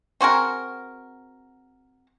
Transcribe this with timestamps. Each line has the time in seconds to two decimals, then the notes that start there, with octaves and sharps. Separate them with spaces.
0.21 C4 F#4 G#4 A#4